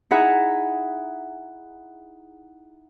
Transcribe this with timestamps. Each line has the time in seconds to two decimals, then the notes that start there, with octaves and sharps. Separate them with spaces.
0.11 D#4 E4 G#4 E5 F#5 A#5